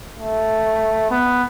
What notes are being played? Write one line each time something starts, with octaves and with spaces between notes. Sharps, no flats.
A3
B3